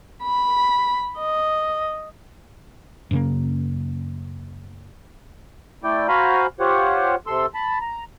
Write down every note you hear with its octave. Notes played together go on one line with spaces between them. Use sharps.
B5
D#5
F#2 C#3 A#3
A3 E4 D5 G5
F#4 C5 F5 G#5 A#5 B5
F4 G4 C5 C#5 F#5
C3 A4 C6 E6
A5 B5
A#5